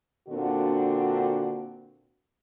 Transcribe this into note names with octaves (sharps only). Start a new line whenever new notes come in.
A#2 D3 C4 D4 F#4